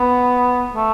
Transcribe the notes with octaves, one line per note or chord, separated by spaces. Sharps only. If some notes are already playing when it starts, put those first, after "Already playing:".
Already playing: B3
A3